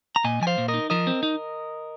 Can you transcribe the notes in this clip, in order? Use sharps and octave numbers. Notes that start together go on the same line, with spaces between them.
A#5
A#2 D#5 G#5
F3 G#5
C5 F5
A#2
A#4 D#5
D#4
F3 A#4 D#5
C4
D#4